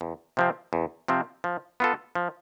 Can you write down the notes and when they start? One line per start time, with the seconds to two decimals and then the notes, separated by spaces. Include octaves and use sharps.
0.01 E2
0.37 C3 F3 C4
0.73 E2
1.08 C3 F3 C4
1.44 F3
1.80 B3 F4 A4
2.15 F3